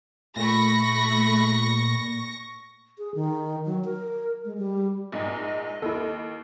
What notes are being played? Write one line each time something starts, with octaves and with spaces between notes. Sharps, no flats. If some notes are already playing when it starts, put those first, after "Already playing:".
A#2 A3 B5 C#6 A#6
G#4
D#3
F#3
A#4
G#3
G3
A#1 G#2 D#5
D#2 E4 A4